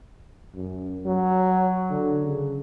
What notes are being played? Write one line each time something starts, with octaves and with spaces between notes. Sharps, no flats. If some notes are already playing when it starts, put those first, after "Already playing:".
F#2
F#3
D3
C#3